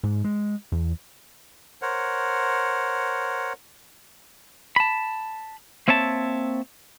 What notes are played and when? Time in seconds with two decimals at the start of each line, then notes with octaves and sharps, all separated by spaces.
0.03 G#2
0.24 G#3
0.72 E2
1.82 A#4 C5 C#5 F#5
4.76 A5 B5
5.88 A#3 C4 C#5 E5 A5